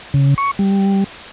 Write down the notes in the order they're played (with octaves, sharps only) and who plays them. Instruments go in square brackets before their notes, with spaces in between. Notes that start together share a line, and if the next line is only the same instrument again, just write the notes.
[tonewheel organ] C#3
C#6
G3